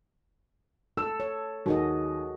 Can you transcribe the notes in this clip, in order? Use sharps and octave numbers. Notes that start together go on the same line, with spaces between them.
A4 E6
C#5
D#2 F#4 G#4 D#5